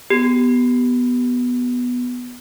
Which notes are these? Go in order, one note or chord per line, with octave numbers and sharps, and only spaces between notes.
B3 G4